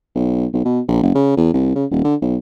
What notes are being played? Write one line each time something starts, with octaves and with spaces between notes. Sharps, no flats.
B1
B1
B2
A#1
F#1
C#3
E2
C2
C#3
D#1
D3
B1